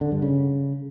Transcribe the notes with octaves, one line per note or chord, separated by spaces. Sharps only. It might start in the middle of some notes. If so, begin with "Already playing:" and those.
D3
G2
C#3